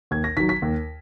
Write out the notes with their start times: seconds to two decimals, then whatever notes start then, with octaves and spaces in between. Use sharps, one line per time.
0.11 D#2 G#6
0.24 A#6
0.36 D#3 F#3 B6
0.49 B6
0.62 D#2